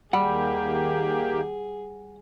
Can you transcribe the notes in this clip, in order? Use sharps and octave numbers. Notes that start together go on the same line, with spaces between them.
D#2 G3 A#3 G4 G#4 F#5